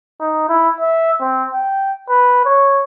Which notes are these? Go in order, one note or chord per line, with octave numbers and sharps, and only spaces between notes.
D#4
E4
E5
C4
G5
B4
C#5